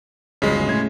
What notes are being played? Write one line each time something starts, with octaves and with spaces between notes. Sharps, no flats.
D1 G1 C#3 G#3 B6
A2 C#4 G#6